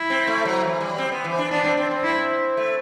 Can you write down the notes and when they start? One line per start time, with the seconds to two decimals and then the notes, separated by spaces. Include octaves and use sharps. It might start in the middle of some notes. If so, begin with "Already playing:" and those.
Already playing: E4
0.10 C4
0.27 A3
0.45 F#3
0.64 E3
0.80 G3
0.98 C4
1.12 B3
1.24 E3
1.38 D4
1.51 B3 D4
1.64 C4
1.77 C4
1.91 C4
2.04 E4
2.57 A3